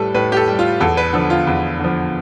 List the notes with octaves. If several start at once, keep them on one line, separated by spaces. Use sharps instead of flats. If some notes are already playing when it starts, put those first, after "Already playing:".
Already playing: A2 G3 A4 B4
A2 B4
G4
A4
G3
F4
E2 A4
B4
D3 F3 A4
F4
E2
D3 F3